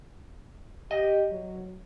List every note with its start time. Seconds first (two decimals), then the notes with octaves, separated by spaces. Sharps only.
0.91 G4 D#5
1.30 F#3